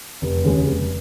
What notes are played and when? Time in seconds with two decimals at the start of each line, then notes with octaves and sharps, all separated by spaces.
0.22 F1
0.44 D#2 C#3 G#3
0.66 F1